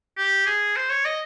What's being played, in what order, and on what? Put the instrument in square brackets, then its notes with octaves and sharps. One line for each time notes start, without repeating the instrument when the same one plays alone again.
[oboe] G4
G#4
C5
C#5
D#5